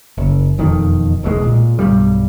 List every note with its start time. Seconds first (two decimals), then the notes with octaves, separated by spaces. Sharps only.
0.18 F#1
0.58 E1 F2 D#3
1.23 E1 B1 B2 G#3
1.44 A#2
1.79 B1 E2 G2 G3